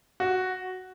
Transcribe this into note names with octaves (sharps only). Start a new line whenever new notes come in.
F#4